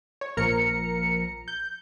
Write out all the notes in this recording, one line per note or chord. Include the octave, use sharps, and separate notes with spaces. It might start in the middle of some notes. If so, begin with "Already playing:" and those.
C#5
A#1 A#2 F3 A#4 A#5 C#7
G6